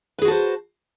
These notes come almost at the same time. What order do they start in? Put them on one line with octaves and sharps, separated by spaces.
B4 G#4 F#4 A5 C5